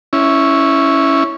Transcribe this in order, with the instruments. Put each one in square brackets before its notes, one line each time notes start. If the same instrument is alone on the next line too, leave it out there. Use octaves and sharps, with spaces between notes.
[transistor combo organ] C#4 E4